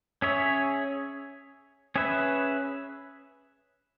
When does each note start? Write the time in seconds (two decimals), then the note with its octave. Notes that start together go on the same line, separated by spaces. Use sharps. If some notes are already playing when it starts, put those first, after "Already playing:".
0.22 C#4 G#4 C#5 E5
1.96 C#4 G#4 B4 E5